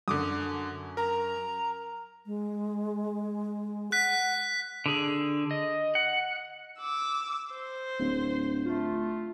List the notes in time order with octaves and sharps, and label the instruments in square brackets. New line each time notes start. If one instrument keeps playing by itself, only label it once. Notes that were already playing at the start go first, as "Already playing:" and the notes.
[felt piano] F#2 [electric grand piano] D3 D6 D#6
[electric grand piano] A#4 [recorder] A#5
[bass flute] G#3
[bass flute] F#5 [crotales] F#6 B6
[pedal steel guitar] D3 G#4
D#5
F#5
[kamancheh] D6 E6
C5
[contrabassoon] D1
[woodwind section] A3 F4